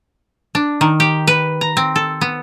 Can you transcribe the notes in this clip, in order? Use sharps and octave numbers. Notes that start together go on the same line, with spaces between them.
D4
D#3
G4
B4
A#5
C4
A4
B3